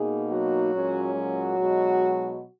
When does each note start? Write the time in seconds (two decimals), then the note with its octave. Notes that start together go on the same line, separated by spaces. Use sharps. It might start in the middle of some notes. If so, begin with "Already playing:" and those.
Already playing: B2 A#3 D#4 G#4
0.31 F#3 F#4
0.73 A#2 G#3 C#4
1.15 F#3 F#4
1.58 B2 G#3 D#4